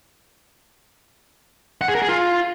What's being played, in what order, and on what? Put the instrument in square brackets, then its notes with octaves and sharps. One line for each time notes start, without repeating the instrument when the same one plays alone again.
[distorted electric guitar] F#5
G#4
A#4
G#4
F4